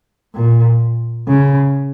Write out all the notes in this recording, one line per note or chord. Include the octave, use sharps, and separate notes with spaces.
A#2
C#3